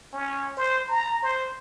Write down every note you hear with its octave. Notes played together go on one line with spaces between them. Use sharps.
C#4
C5
A#5
C5